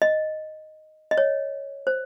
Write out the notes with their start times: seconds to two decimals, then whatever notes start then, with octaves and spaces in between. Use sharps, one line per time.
0.02 D#5
1.11 D#5
1.18 C#5
1.87 C5